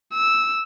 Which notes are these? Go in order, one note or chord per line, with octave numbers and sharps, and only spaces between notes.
E6